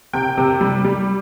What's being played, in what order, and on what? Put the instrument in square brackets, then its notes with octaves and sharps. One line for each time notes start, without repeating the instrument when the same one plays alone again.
[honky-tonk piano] C3 G5
C3
G3
G3